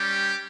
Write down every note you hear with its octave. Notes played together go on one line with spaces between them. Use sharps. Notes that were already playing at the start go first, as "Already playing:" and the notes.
Already playing: G3 C#4 G4